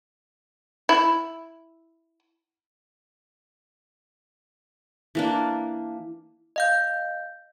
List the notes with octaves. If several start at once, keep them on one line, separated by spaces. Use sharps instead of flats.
E4
E3 A#3 D4
D#5 F5 G6